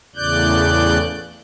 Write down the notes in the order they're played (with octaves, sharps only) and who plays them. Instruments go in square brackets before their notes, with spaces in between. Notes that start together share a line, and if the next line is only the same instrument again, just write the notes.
[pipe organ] E2 A2 C#3 D5 F#6 G6